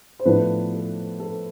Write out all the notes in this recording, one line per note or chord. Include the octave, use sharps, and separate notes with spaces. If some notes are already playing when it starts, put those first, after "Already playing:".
C5
A2 F3 B3 D4 B4
A4
A4